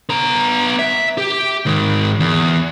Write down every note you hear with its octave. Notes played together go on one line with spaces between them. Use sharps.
B3 A#5
E5
G4
G#2 D#3
E2